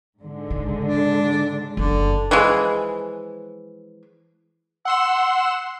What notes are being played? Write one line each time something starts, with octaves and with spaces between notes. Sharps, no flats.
G#2 D3 G#3
C#3
D4
F#1 F#2 D3
E3 F3 G#3
F#5 C6 E6 E7